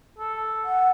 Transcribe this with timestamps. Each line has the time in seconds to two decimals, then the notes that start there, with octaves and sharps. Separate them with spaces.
0.18 A4
0.65 F#5